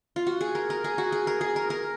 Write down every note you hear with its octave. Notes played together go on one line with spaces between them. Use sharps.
F4
F#4
G#4
A#4
A#4
G#4
F#4
G#4
A#4
G#4
A#4
A#4